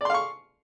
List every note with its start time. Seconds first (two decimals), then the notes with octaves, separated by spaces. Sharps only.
0.01 D5
0.05 C6
0.10 F5
0.14 C#6